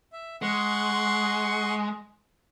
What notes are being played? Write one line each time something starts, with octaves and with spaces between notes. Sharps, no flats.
E5
G#3 F#5 C6 C#6